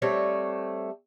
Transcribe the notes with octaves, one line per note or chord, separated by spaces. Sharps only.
G3 A3 C4 C#5